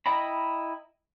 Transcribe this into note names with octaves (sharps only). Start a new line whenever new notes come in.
E4 D#5 G5 A#5 B5